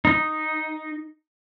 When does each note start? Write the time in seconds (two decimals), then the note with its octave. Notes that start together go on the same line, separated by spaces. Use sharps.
0.05 D#4